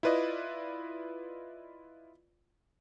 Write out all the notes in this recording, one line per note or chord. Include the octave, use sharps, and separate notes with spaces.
E4 F4 B4 D5 D#5